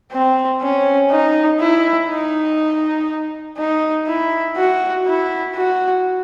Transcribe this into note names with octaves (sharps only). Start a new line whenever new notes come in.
C4
C#4
D#4
E4
D#4
D#4
E4
F#4
E4
F#4